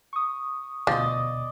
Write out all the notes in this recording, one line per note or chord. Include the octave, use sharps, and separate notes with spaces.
C#6 D#6
D2 B2 F3 D5 D#5